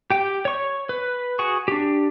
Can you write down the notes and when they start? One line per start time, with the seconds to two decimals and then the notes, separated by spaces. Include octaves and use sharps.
0.10 G4 G5
0.45 C#5 C#6
0.89 B4
1.39 F#4 G#4 C#6
1.68 D4 G4